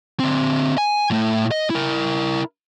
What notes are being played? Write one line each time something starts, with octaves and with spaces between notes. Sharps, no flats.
D3 C4
G#5
A2 A3
D#5
E4 A#4